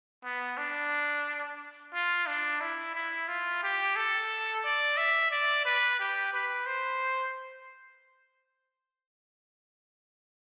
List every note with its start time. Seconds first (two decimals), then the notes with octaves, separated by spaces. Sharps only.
0.24 B3
0.58 D4
1.94 F4
2.27 D4
2.61 E4
2.95 E4
3.28 F4
3.63 G4
3.96 A4
4.64 D5
4.97 E5
5.31 D5
5.65 B4
6.00 G4
6.33 B4
6.66 C5